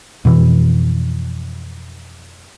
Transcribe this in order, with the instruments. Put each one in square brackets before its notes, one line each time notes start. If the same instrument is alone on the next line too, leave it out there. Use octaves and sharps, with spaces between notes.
[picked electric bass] F2 B2 E3